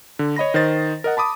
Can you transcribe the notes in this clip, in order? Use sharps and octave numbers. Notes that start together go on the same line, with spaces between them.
D3
C#5 D#5 B5 A#6
D#3 C5 D#5 A6
A#4 D#5 F#5
A5 B5 D6 D#6